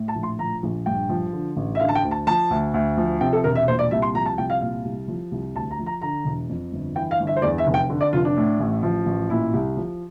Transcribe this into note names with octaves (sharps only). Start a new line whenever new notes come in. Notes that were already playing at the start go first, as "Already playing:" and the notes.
Already playing: A2
A5
A#1
C6
F3 A#5
A#1
G2 G5
F3
D3
A1
E5
D3 F5
A5
G5
D2
A5
F3 A5
D2
D2
F3
C3 G5
A4
E1 A#4
E5
A#2 C5
D5
C2 E5
C6
F3 A#5
A5
C2 G5
F5
A#2 F5
C2
F3
C2
D2 A5
A#5
F3
A#5
D3 A#5
E1
F2
G1
E3 G5
F5
G1
E5
C5
E2 D5
E5
F1
G5
D3
D5
F1 F4
D4
A2
A1
F3
A1
A#2 E4
C2
F3